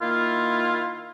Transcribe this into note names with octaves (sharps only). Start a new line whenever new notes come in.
D#3 A#3 E4 F4